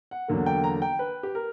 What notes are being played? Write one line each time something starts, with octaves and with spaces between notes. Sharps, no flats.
F#5
E2 D3 F#3 A#3
G5
A#5
G5
B4
G4
A#4